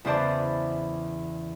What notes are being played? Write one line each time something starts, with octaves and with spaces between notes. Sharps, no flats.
E2 C#3 E3 C5 D5 A5